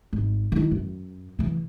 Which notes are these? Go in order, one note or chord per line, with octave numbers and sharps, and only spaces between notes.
G#1
D#3 E4
F#2
C#3 E3